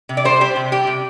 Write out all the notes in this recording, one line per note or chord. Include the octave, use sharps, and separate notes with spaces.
C3
D5
G3 C5
G3 G4
C3
G3 G4
C3